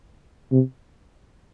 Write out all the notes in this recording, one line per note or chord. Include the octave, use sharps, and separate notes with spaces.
C3